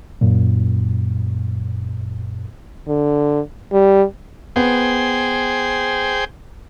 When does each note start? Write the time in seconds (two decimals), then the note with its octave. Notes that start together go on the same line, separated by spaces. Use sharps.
0.21 F#2 A#2
2.88 D3
3.72 G3
4.56 B3 G#4 C5 G5